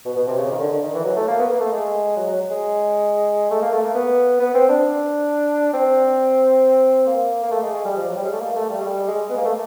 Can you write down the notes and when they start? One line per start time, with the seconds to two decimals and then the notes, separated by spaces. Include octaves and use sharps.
0.05 B2
0.16 B2
0.27 C3
0.38 C#3
0.51 D#3
0.60 D3
0.72 D3
0.83 D#3
0.94 E3
1.05 F#3
1.16 A3
1.28 A#3
1.39 B3
1.50 A#3
1.60 A3
1.72 G#3
2.16 F#3
2.27 F#3
2.50 G#3
3.51 A3
3.62 A#3
3.72 A3
3.84 A#3
3.95 B3
4.40 B3
4.54 C4
4.69 D4
5.74 C4
7.07 A#3
7.43 A#3
7.51 A3
7.63 G#3
7.74 G#3
7.85 G3
7.96 F3
8.08 F#3
8.16 G3
8.24 G#3
8.32 A3
8.40 A#3
8.55 A3
8.70 G3
8.81 G#3
8.85 G3
9.08 G#3
9.30 B3
9.37 A#3
9.45 A3